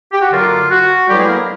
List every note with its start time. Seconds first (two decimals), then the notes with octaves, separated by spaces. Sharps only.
0.12 G4
0.21 F#4
0.32 F#2 D3 F#3 A#3 D4 F4
0.70 F#4
1.08 D3 F#3 G3 B3 E4 G4
1.17 G#3 G#4
1.27 A#3 A#4